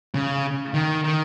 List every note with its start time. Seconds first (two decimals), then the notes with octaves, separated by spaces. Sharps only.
0.15 C#3
0.74 D#3
1.04 D#3